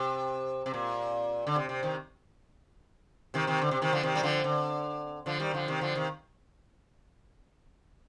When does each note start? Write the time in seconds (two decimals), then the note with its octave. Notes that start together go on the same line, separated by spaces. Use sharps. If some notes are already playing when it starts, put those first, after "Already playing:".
Already playing: C3
0.66 C3
0.74 A#2
1.47 D3
1.56 C3
1.69 C3
1.83 C3 D#3
3.34 C3 D#3
3.47 C3 D#3
3.62 D3
3.71 C3
3.82 C3 D#3
3.93 D3 F3
4.03 C3 D#3
4.16 G3
4.23 D3 F3
4.44 D3
5.26 D3 F3
5.40 D#3 G3
5.54 D3 F3
5.68 C3 D#3
5.81 D3 F3
5.95 C3 D#3